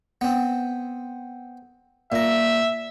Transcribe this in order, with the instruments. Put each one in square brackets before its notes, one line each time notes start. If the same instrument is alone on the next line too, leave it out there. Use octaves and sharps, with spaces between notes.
[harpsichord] B3 C4
[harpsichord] A#2 A#5 [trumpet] E5